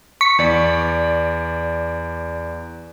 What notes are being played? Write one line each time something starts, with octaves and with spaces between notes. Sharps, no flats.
C#6 B6
E2 D5